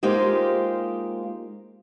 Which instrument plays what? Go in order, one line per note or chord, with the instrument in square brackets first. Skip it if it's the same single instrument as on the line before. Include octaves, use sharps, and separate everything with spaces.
[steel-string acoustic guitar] G#3 A#3 D#4 F4 G4 C5